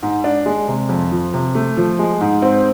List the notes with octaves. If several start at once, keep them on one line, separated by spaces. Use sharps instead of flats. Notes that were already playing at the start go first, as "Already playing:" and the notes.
G#2
D4
G#3
C3
F2
F3
C3
A3
F3
G#3
G#2
C4